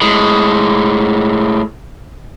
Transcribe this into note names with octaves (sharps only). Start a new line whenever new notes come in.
A2 G#3